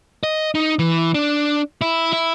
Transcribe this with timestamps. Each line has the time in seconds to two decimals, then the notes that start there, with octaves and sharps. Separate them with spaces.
0.23 D#5
0.55 D#4
0.79 E3
1.14 D4
1.81 E4
2.13 E4